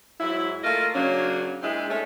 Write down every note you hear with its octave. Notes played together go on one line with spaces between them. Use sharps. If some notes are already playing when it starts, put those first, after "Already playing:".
G#2 F#3 E4
A3 A#3 F4 D#5 F5
C#3 F#3 A#3 C#4 D4
A#2 G#3 C4 D4 E4
A3 C#4